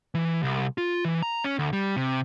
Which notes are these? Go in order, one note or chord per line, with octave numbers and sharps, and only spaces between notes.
E3
C2
F4
E3
A#5
C#4
D2
G3
C3